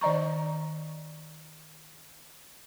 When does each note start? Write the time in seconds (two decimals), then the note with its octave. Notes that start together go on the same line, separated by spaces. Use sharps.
0.01 D#3 D5 D#5 A#5 C#6